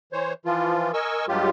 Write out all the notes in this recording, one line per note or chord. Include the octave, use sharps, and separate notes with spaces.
E3 C5 C#5
E3 F3 F4
A#4 D#5 G#5 C#6 E6
G2 F#3 G#3 F4 G4